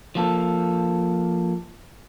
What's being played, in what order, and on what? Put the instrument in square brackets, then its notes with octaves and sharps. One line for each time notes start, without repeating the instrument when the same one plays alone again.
[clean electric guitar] F3 A#3 A4